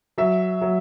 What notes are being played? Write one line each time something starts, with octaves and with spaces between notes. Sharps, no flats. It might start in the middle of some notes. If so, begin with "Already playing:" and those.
F#3 E5
F#3